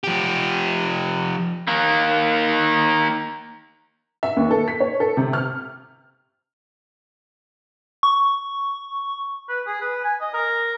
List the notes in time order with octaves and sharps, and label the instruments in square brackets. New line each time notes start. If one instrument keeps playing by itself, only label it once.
[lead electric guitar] F3 G4
D#3 A#3
[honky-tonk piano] E5
D#2
A4
B6
C#5
A4
C3
F6
[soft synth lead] C#6
[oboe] B4
G#4
B4
G#5
D#5
A#4